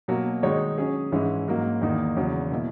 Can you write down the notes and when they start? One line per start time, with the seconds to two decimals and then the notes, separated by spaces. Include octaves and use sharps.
0.08 B2 F#3 A#3
0.43 D#3 G#3 D#4 F#4 C#5
0.78 F#3 C#4 G#4
1.12 G#2 E3 G#3 C#4 E4
1.48 G#2 F#3 A#3
1.81 E2 D#3 A#3 D#4
2.17 E2 C#3 F#3 C#4
2.51 B2 A#3 E4